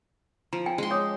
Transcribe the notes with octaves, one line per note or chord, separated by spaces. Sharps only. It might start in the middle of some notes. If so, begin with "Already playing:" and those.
F3 A#5
C5 G5 G#5
G#3 C#4 C6
C#5 D6 D#6